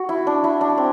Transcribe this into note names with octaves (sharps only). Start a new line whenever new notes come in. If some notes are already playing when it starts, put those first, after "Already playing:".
Already playing: F#4
E4
D4
E4
D4
C4